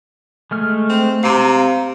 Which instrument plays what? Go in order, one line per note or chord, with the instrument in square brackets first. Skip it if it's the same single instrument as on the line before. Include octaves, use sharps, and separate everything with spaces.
[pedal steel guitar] G#3 A3 F6
[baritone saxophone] C4
[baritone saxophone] C3 [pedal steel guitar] F5 A#5